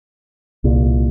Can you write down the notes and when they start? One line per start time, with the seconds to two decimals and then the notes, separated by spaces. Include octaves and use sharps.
0.64 C2 A#2